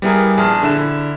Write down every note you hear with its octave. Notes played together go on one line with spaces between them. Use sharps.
G3 B3 E4 G#4 A#4
A#1 G#4 A5 F6
D3 E4 E7